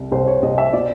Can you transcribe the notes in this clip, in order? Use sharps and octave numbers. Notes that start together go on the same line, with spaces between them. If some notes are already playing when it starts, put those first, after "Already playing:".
Already playing: C2
C2 C5
C#5
C2 D#5
E5
B2 D5